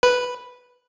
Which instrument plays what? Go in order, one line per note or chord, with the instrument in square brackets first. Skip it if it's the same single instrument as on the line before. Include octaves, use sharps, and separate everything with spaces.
[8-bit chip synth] B4